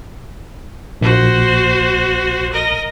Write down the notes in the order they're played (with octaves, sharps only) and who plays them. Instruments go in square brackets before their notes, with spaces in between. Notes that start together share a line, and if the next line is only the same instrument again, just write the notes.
[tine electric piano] A#1 [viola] F#4 C5
[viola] A#4 D#5